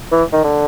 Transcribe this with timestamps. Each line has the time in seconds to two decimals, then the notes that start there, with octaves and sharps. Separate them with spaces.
0.12 E3
0.33 D#3
0.44 D3